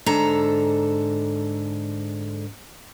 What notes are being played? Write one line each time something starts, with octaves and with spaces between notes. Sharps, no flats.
G#2 D3 A4 A#5